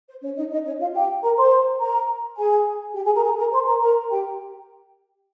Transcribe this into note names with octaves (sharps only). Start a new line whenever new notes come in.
C5
C#4 C#5
D#4 D#5
D#4 D#5
C#4 C#5
F4 F5
G4 G5
A#4 A#5
C5 C6
A#4 A#5
G#4 G#5
G4 G5
G#4 G#5
A#4 A#5
G#4 G#5
A#4 A#5
C5 C6
A#4 A#5
A#4 A#5
G4 G5